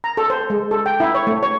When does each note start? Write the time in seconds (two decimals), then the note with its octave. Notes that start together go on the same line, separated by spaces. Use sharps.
0.04 A#5
0.17 A4
0.30 C5
0.50 G#3
0.71 A4
0.86 G5
1.00 E4
1.15 C#5
1.27 A3
1.43 C#5